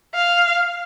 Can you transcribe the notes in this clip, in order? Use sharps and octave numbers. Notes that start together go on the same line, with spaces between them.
F5